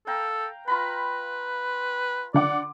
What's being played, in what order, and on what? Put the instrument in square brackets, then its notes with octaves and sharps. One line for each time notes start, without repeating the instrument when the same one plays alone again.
[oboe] A4 [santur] F5 G5 A#5
[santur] F4 A#5 B5 [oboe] B4
[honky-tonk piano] D3 F#5 D6 [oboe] D5